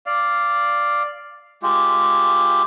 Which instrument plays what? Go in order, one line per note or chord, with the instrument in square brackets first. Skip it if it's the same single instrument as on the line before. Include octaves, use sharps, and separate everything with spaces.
[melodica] D5 F5
G#3 F4 G4